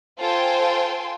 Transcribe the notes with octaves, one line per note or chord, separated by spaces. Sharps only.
F4 A4 C5 G5 G#5 C6